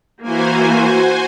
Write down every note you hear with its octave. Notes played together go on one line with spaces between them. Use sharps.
E3 A#3 F#4 C5 G#5